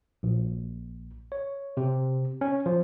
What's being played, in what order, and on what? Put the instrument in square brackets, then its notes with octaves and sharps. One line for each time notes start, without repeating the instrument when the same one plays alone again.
[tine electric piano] A#1
C#5
C3
C#4
F3